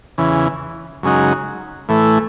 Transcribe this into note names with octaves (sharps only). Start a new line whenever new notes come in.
E2 C#3 E3
F#2 C#3 G#3 D#4 F#4
A2 E3 A3